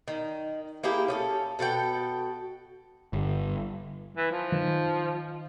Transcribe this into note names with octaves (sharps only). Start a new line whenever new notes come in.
D#3
A#3 E4 G4 G#4
C#4 G4 A4
B2 A4 F#5 G5
G1
E3
F3
D#3